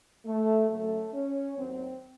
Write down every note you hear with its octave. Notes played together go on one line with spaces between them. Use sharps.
A3
F#2 C#3 F#3 A3
C#4
D#2 D#3 F#3 C4